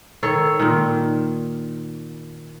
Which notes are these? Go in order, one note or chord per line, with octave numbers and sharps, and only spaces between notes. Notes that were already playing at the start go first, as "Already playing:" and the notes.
D#3 A4 C#5
A#2 D#3